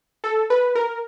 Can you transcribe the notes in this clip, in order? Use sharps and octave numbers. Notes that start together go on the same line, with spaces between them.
A4
B4
A#4